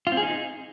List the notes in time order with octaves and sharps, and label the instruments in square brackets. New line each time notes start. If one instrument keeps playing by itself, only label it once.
[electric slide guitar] F4
C4
G#4
D#4